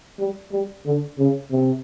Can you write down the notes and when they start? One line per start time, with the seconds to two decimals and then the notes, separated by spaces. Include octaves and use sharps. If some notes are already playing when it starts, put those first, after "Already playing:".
0.19 G3
0.52 G3
0.85 D3
1.19 C#3
1.51 C3